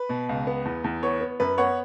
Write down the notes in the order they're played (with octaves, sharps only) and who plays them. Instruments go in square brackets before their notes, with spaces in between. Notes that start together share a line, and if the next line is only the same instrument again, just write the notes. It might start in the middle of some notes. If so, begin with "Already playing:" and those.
Already playing: [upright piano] B4
B2
C#2
B3
E2
E2
B3 C#5
B3
F#2 B4
B3 C#5 F#5